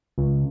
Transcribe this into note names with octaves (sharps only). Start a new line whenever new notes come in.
C#2